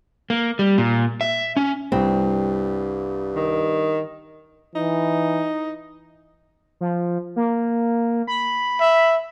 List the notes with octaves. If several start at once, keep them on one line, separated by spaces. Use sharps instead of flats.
A#3
G3
A#2
E5
C#4
C2 G2 C4
D#3
E3 D#4
F3
A#3
B5
E5